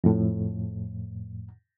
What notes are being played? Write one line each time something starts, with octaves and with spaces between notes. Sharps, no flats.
F2 A2